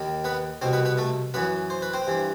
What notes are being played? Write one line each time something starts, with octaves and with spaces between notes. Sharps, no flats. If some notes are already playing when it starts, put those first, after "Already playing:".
Already playing: D#2 D#3
B3 B4
C2 B2 C4 C5
B3 B4
B3 B4
A3 A4
F#2 E3 B3 B4
C5
B4
C4 C5
G2 E3